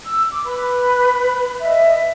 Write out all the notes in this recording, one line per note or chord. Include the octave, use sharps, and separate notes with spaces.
E6
D6
B4 B5
D#5 E5